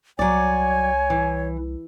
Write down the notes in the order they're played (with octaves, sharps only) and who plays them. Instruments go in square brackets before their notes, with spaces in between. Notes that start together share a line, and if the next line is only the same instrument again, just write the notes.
[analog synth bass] C2 [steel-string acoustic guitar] F#3 D5 [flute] C#5 [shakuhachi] G#5
[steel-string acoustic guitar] E3